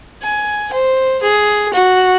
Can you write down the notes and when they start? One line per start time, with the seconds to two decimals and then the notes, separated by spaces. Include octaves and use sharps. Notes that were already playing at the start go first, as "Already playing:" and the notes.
0.22 G#5
0.72 C5
1.22 G#4
1.72 F#4